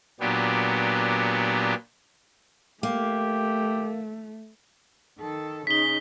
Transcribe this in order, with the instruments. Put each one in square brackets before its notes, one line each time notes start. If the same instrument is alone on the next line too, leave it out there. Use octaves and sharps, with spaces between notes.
[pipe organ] A#2 F#3 B3 D4 G4
[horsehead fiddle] A3 [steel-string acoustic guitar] A#3 [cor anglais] G4
[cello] D#3 A4
[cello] C#3 D#4 [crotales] B6 G7